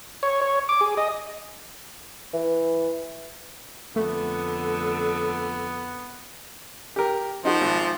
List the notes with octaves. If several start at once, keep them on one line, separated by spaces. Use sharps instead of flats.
C#5
C#5
D6
G#4
D#5
E3
F2 D3 A3 B3
G4 A#4
F3 D#4 F#4
G#1